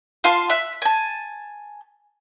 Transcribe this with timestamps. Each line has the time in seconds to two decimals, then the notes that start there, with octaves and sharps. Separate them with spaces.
0.24 F4 F5 A5 C6
0.50 E5 F#6
0.82 G#5 A5